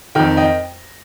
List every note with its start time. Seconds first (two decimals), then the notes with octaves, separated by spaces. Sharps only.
0.15 F2 D#3 G5
0.37 D#5 G5